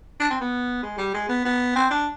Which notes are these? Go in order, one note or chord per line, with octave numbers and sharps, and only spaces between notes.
D4
C4
B3
G#3
G3
G#3
B3
B3
C4
D4